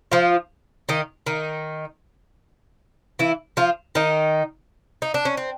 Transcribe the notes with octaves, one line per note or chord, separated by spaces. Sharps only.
F3 F4
D#3 D#4
D#3 D#4
E3 E4
F3 F4
D#3 D#4
D#4
D4
C#4
C4